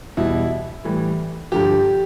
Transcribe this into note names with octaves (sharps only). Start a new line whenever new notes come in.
E2 B2 G3 E4
A2 E3 G3
G2 D3 F3 G4